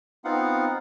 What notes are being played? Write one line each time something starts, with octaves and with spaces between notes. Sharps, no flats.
B3 C4 D#4 F4 F5 F#5